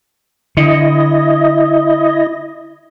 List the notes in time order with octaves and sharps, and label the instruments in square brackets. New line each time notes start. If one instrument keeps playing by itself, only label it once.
[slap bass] D3 [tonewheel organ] E4 D#5